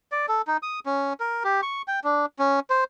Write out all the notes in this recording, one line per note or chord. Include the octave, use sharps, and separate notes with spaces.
D5
A4
D#4
D#6
C#4
A#4
G4
C#6
G5
D4
C#4
C5